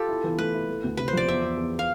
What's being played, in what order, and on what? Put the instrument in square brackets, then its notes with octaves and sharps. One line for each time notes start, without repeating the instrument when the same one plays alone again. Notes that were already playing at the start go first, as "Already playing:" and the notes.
Already playing: [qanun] F4 G4 A4
[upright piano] E4
E3
[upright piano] A3 [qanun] B4
[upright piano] E4
A3
D2
[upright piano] C3 [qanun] B4
[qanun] C5
[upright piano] F3 [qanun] D5
[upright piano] E2 [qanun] E5
[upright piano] E2
E2
[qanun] F5